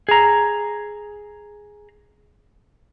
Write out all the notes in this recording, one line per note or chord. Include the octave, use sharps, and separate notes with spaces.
G#4 A#5